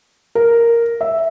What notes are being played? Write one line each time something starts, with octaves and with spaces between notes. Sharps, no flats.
A#4
E5